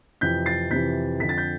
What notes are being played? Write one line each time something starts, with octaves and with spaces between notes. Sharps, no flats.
F2 C3 E3 G6 B6
A6 C7
F2 C3 E3 G6 B6
F2 D3 B6
A6
G6 B6